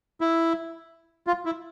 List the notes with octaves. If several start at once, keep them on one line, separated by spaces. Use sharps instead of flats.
E4
F4
E4